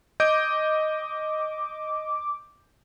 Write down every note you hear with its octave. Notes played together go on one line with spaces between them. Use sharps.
D#5 D6 G6 D7